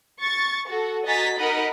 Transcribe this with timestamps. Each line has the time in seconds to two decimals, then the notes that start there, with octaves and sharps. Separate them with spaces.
0.20 C#6 A6
0.69 F#4 A4
1.06 F#4 D#5 G#5 A#5 A6 B6
1.37 D#4 A#4 D#5 F#5 B5